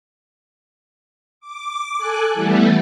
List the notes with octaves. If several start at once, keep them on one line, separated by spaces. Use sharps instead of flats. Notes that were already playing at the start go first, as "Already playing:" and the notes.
D6
A4 G#5 F#6
E3 G3 A3 B3